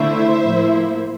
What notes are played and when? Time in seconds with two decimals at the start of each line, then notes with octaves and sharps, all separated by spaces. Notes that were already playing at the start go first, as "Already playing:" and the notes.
Already playing: D3 A3 E4 C5 E5
0.43 A2 F3 A#3 E4